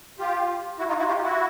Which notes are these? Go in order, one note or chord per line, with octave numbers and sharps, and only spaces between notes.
F4 G4
E4 F#4
D#4 F4
E4 F#4
F4 G4
E4 F#4